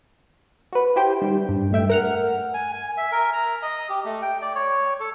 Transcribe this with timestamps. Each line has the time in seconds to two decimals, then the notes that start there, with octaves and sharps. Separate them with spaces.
0.73 F#4 B4
0.96 E4 G4 C5 G5
1.22 D#3 G3
1.49 G2
1.71 G2 A3 E5 G5
1.89 A#4 F#5 F6
2.54 G#5
2.72 G#5
2.97 E5
3.12 A#4
3.33 A#5
3.62 D#5
3.89 G4
4.05 A3
4.22 G5
4.42 D5
4.55 C#5
5.00 A4